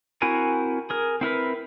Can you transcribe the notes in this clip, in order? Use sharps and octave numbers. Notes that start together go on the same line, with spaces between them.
C4 E4 F#4 A#4 G#5
G#4 A#4
C4 E4 A#4 B4